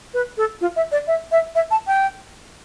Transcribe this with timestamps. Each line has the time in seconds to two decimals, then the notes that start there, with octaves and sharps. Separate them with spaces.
0.14 B4
0.37 A4
0.61 F4
0.76 E5
0.92 D5
1.07 E5
1.32 E5
1.55 E5
1.71 A5
1.87 G5